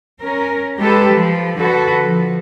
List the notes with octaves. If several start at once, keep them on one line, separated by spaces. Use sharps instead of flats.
C#4 A#4
G#3 G4 A4 B4
F3
D3 F#4 A4 B4
F3